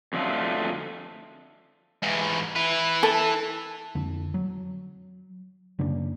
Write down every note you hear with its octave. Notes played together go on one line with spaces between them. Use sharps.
F2 D3 F#3 A3 F4
G#2 E3
E4 B4
A4
F2 D3
F#3
F#2 C#3 A#3 D4